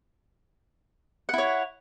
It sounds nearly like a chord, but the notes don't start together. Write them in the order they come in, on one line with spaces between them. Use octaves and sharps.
F#5 E4 C#5